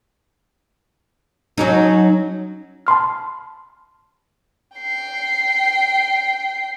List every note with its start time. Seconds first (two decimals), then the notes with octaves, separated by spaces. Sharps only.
1.58 F#3 C#4 D#4
2.87 A5 B5 C6 F6
4.77 G5 C7